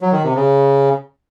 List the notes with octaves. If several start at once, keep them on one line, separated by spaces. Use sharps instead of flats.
F#3
D#3
C3
C#3